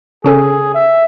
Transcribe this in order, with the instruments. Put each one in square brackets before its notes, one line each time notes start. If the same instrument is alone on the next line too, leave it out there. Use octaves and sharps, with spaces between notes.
[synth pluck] C#3 C#4 A4 [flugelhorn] G#4
[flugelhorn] E5